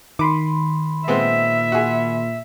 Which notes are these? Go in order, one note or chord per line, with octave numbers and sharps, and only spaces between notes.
D#3 B5 C6 D6
A#2 G#3 B3 C4 E5
F#4 G#4